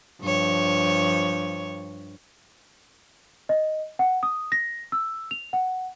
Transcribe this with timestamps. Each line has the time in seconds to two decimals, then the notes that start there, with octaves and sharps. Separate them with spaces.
0.22 G2 F3 C#5
3.49 D#5
3.99 F#5
4.23 D#6
4.52 A#6
4.92 E6
5.31 F7
5.53 F#5